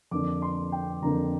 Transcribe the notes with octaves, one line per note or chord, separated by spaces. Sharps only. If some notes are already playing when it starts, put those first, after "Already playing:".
F2 D3 A#3 D4 D6
C6
G5
F2 D3 A#3 D4 A#5